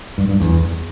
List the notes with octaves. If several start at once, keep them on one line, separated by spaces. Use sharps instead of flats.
G2
G2
E2